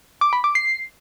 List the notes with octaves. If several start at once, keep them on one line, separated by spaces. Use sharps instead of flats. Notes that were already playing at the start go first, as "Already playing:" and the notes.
D6
B5
D6
C7